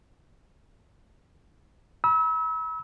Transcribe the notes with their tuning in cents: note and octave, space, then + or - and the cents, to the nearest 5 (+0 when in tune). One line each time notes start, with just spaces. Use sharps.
B5 -35 E6 -35